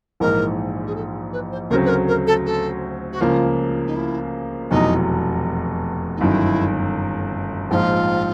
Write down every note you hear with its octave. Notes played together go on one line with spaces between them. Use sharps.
A#1 G#2 E3 G#3 A#4
G#4
A4
B4
C5
D2 C#3 F#3 A3 C4 A#4
B4
A#4
A#4
A4
A4
F#4
C#2 C#3 F3 A#3 F4
D#4
E4
F1 E2 B2 F#3 D#4
D#4
G1 F#2 D#3 E4
A#1 G#2 F3 F4